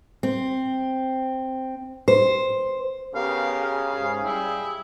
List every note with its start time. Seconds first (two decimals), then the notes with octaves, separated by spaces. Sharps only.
0.23 C4
2.08 C5
3.15 C#3 B3 G4 A#4 F5
3.61 G#4 F5
3.93 G#2
4.24 G3 E4 G5